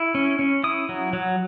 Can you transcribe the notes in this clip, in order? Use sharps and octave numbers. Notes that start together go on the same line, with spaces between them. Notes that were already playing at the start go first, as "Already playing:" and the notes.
Already playing: E4
C#4
C#4
E4 D#6
F#3
F#3